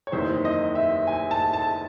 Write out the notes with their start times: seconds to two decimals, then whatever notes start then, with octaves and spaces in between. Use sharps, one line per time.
0.07 C#5
0.12 F#1 E2 C3 D#3 C5
0.45 D#5
0.75 E5
1.07 G#5
1.31 A5
1.53 A5